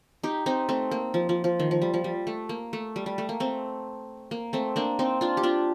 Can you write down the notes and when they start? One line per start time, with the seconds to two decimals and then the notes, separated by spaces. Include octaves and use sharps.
0.23 D#4 G4
0.46 C4 D#4
0.69 A3 C4
0.91 A#3
1.14 F3
1.29 F3
1.44 F3
1.60 D#3
1.71 F3
1.82 G3
1.94 F3
2.04 G3
2.27 A3
2.49 A#3
2.73 A3
2.96 G3
3.06 G3
3.18 A3
3.29 A#3
3.40 A3 C4
4.31 A#3
4.53 A3 C4
4.76 A#3 D4
4.99 C4 D#4
5.21 D4 F4
5.37 G4
5.43 D4 F4